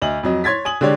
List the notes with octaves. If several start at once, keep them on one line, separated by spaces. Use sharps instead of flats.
D2 D#5 F#7
F2 F#3 D#5
C#5 C6 G#6 A6 B6
G#5 D#6 F#7
D3 G#3 G4 C#5 D5